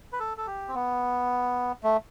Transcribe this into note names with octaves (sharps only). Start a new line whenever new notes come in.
B4
A4
A4
G4
C4
B3
A3